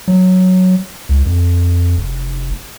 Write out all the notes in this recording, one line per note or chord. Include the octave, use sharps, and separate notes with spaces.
F#3
C#2
F2
F1